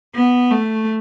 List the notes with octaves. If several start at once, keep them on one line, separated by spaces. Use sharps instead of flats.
B3
A3